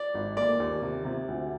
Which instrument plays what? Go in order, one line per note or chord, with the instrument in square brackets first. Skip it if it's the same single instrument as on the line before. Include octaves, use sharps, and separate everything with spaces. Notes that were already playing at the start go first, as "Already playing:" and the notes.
Already playing: [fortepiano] D5
[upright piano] G#1
[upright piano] A#3 [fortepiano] D5
[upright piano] D#2
C3
C3
D2